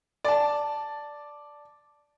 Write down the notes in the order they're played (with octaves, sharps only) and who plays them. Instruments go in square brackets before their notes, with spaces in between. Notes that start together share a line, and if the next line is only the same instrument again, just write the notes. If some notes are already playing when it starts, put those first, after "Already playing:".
[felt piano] D5 A5